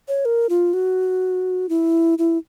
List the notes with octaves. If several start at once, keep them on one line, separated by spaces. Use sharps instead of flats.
C#5
A#4
F4
F#4
E4
E4